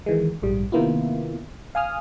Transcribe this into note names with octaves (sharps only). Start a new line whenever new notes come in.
D#3 E3 G#3
A#1 G#2 G3
C3 D#3 A#3 B3 E4 F4
F5 G#5 D#6 F6